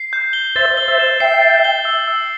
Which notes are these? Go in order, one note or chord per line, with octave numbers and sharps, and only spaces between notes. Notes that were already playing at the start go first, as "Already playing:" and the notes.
Already playing: C7
G6
G7
C5 E5 A6
G7
C5 E5
E7
E5 G5 C7
A6
G7
E6
E6